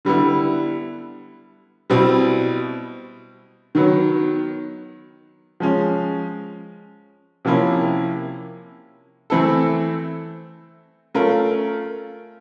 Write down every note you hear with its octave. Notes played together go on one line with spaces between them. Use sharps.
D3 G3 B3 E4
B2 G3 C4 E4
D#3 F#3 B3
F3 G#3 C#4
C3 F3 A#3 C#4 E4
E3 A3 C4 E4 A4
A3 C#4 F4 A#4